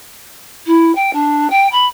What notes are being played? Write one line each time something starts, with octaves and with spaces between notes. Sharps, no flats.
E4
G5
D4
G5
B5